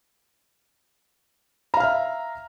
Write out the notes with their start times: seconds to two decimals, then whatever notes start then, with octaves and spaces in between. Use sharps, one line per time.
1.74 A#5
1.77 F5
1.80 F6
1.83 E5